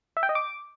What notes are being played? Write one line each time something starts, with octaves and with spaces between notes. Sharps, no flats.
E5
G5
D#5
D6